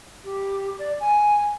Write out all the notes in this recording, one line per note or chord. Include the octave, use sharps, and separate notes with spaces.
G4
D5
G#5